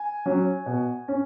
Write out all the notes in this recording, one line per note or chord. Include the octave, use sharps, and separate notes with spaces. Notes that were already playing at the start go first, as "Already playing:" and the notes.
Already playing: G#5
F#3 C#4
B2
C#4